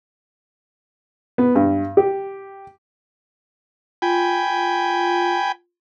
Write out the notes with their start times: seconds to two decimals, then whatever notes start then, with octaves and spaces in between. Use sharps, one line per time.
1.38 B3
1.56 G2
1.97 G4
4.02 F4 G5 G#5 B5